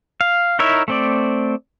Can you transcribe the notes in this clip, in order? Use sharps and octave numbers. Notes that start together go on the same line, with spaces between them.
F5
D#4 E4 A#4 C#5 E5
A3 C4 D5